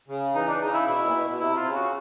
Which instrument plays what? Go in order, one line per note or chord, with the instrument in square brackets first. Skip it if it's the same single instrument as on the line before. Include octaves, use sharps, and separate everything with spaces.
[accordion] C#3
[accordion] E3 [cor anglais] D#4
[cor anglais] D4
[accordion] C#3 [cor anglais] D#4
[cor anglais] E4
[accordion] B2 [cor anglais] E4
[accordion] A#2
B2
B2
[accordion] C3 [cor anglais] E4
[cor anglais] F4
[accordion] C#3
[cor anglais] F#4